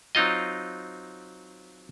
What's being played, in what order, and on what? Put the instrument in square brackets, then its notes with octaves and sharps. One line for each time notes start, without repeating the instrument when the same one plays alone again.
[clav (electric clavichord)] F#3 C4 D#4 F4 D#5